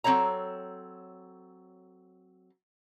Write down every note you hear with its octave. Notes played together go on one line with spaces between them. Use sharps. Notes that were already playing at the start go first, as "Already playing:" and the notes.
F#3 C4 A4 C#5 A#5